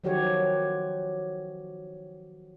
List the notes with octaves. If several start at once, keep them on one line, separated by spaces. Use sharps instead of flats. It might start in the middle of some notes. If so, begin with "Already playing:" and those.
D#3 F3 F#3 F#4 G4 C#5